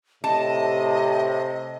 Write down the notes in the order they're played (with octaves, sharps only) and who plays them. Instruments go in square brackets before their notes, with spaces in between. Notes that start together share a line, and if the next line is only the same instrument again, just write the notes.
[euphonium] A2 [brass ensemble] C3 [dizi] D#5 [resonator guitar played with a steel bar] A5